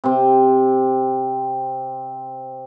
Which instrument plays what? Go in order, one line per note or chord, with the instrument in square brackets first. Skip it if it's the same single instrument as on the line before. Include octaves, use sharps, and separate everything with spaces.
[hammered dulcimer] C3 C4